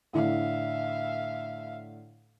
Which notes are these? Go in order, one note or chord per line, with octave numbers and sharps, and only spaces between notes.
A2 D3 E5 F5